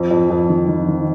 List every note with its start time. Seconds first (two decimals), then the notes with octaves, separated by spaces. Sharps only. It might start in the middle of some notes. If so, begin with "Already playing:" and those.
Already playing: F2
0.11 F2
0.30 F2
0.49 D#3
0.68 D#3
0.88 D#3